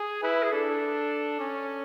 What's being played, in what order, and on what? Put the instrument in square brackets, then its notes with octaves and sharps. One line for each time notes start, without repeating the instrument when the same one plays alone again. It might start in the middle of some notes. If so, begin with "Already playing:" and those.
Already playing: [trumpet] G#4
[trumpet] E4 [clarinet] B4
[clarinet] G#4
[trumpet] D4 [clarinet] A4
[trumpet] C#4